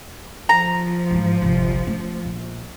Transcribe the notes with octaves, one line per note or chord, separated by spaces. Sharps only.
F3 A#5
G#2 E3
G1 C2
A3 C#4
A#1